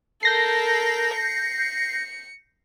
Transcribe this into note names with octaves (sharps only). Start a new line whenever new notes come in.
A4 A#4 G6 A#6 C7
C#7